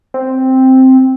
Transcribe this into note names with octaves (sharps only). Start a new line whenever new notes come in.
C4